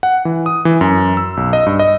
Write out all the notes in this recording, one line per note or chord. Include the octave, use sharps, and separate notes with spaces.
F#5
E3
D#6
E3
F#2
E6
B1
D#5
G2
D#5